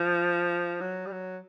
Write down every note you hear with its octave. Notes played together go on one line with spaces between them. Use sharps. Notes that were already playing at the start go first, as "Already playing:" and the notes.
Already playing: F3
F#3
G3
F#3